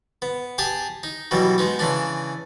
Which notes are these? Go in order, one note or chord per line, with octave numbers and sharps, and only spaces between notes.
B3
G4 G#4 G#5 A5
D#4
B2 E3 F#3 G3
G#3 B3 D#4
C#3 E3 D4